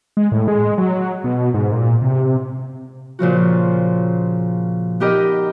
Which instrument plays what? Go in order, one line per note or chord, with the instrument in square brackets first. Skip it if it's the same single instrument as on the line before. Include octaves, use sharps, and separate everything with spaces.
[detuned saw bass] G#3
A2
G#3
F#3
B2
G#2
A#2
C3
[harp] A#2 C#3 F3 F#4
B3 D#4 G4 A#4 D#5